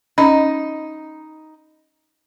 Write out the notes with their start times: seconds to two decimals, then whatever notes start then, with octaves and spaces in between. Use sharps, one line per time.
0.18 C#4 D#4 B5